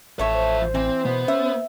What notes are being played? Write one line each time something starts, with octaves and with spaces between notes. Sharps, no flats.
A1 F3 A3 C#5 E5
C5
E3 C4
B2 B3
C#4 E5